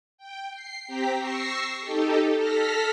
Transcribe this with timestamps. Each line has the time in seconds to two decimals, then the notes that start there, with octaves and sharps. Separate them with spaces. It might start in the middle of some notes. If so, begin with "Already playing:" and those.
0.18 G5
0.51 C7
0.87 C4 G4 G5 A#5 B6
1.17 C#6 E6 A#6 C7
1.80 D#4 G4 A4
2.36 A4 F6 A#6 B6